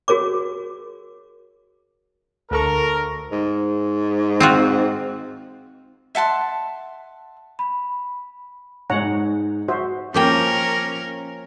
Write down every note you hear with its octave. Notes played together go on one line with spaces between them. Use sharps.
F#4 G#4 A#4 C#5 D6
D2 A4 A#4 C#6
G#2
C4 F4 F#4
E5 F#5 A5 C6
B5
G#2 G#3 D#4 C#5 F#5 A#5
F#4 C5 E5
F3 A#3 C#4 A#4 G5